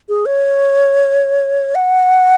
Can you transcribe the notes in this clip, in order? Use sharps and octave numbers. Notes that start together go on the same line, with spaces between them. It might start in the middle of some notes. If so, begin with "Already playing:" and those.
G#4
C#5
F#5